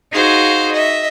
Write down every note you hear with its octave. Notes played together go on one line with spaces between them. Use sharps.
D#4 F#4 G#4 C5 F5
D#5 E5